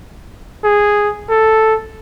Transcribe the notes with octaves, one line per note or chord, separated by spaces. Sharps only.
G#4
A4